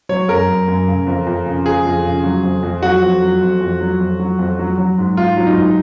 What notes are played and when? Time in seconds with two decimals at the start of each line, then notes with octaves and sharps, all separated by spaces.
0.09 F#3 C#5
0.28 F#2 A#4
0.48 F#2
0.68 F#2
0.88 C#3
1.07 F2
1.27 F2
1.46 C#3
1.65 F3 G#4
1.85 F2
2.05 C#3
2.24 F#3
2.44 F2
2.63 F2
2.83 F#3 F#4
3.03 F2
3.22 F#3
3.41 F2
3.61 F2
3.80 F#3
4.00 F2
4.19 F#3
4.39 F2
4.59 F#3
4.78 F#3
4.98 G#2
5.17 G#2 F4
5.37 F#3
5.47 D#4
5.56 G#2